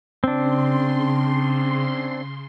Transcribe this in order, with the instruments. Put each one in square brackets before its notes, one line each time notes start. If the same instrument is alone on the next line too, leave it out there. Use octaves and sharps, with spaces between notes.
[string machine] C#3 C6 [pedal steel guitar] C4 D4